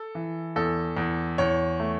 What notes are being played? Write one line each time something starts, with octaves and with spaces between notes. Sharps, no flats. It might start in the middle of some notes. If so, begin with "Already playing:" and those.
Already playing: A4
E3
E2 A4
E2
E2 C#5
A3